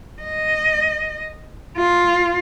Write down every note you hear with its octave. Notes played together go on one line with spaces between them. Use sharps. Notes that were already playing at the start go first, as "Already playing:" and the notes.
D#5
F4